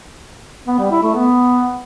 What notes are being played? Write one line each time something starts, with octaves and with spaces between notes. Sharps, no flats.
B3
G3
E4
A3
B3